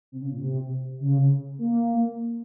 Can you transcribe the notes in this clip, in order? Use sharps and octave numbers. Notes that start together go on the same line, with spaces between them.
C3
C#3
A#2
C3
C#3
A#3